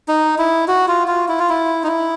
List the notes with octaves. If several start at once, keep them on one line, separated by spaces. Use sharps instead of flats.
D#4
E4
F#4
F4
F4
E4
F4
E4
D#4
E4